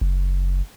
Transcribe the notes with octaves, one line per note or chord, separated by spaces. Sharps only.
F#1